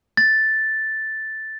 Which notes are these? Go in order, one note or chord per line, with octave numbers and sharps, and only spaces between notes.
A6